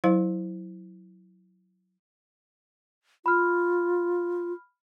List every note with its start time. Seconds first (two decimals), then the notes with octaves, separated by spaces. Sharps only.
0.04 F#3 E4 C5 F5
3.26 F4 B5 F6